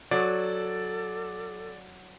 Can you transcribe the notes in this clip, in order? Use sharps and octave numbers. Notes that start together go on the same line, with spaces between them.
F#3 A4 D5